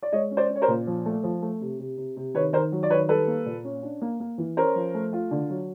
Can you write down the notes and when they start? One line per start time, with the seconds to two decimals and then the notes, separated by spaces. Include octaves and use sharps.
0.02 D5
0.12 G#3 C#5 D#5
0.31 C#4
0.37 C5 D5
0.49 C#4
0.56 C#5
0.62 A#4 C5
0.68 A#2
0.87 F3
1.06 A3
1.23 F3
1.42 A3
1.61 C3
1.79 C3
1.97 C3
2.16 C3
2.34 D#3 B4 C#5
2.53 D#3 A#4 C5
2.72 F#3
2.83 D5
2.90 D#3 B4 C#5
3.09 G3 A4 B4
3.28 A#3
3.45 A#2
3.65 C#4
3.83 D4
4.01 A#3
4.20 A#3
4.38 E3
4.57 C#4 A#4 C5
4.75 F3
4.94 A3
5.13 F4
5.31 D3
5.50 F#3